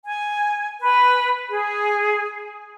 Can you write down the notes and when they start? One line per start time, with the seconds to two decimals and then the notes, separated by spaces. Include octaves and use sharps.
0.04 G#5
0.80 B4
1.49 G#4